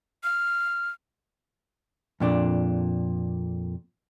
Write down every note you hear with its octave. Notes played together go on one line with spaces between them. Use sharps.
F6
F2 A#2 D4